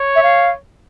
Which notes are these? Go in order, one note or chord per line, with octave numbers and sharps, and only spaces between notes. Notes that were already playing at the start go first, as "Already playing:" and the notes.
Already playing: C#5
E5
F5